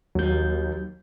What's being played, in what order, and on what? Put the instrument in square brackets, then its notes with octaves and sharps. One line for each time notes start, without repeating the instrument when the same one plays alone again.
[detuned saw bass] D#2 [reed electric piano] F#3 G6